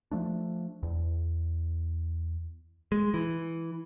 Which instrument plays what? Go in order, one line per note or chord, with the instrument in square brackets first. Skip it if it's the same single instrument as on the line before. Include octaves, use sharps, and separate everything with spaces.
[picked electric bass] F3 A3 D4
E2
G#3
E3